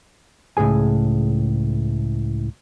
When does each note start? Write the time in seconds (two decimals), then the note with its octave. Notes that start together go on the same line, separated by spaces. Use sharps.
0.57 C#2 A2 C3 G#4 G#5